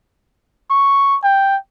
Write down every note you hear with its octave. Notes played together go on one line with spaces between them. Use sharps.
C#6
G5